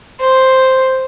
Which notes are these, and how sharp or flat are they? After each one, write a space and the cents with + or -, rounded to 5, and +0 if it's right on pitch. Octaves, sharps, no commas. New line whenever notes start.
C5 +0